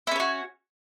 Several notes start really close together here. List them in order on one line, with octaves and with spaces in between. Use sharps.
E4 C#4 C#5 F#4